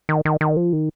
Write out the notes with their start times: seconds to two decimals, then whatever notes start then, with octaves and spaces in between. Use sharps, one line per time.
0.09 D#3
0.25 D#3
0.41 D#3
0.57 F3
0.73 D#3